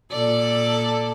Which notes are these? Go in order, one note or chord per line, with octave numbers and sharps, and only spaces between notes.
A#2 A4 D5